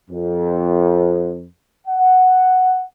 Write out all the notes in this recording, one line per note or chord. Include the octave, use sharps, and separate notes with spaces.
F2
F#5